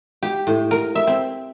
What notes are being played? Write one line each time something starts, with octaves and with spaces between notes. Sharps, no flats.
G4
A2
A#4
E5
C4